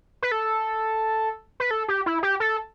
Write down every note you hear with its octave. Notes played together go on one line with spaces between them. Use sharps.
B4
A4
B4
A4
G4
E4
G4
A4